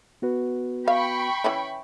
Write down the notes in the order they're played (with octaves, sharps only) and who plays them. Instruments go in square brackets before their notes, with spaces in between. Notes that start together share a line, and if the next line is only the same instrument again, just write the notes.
[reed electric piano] B3 F#4 B4
[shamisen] F5 [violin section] G5 B5 C#6
[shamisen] E3 C#4 E4